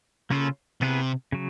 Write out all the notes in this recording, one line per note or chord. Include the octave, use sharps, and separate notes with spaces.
C#3 A#3 C#4 F4 A4
C3 B3 E4 G#4 B4
C#3 F#3